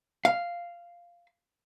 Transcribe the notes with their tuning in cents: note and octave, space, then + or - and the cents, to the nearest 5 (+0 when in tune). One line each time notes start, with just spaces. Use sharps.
F5 -5